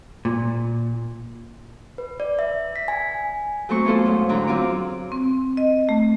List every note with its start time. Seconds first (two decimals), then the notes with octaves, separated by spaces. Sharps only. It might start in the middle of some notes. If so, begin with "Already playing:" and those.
0.25 A#2
1.98 B4
2.20 D5
2.39 E5
2.76 B6
2.88 G#5
3.69 F#3 A3 C4 C#6
3.85 E3 B3 F4 A4 C5
4.06 G#2 C#4
4.29 E2 D3 F#3 A#5
4.47 F#3 C4 F4 D6
5.12 C4
5.57 D#5
5.89 A3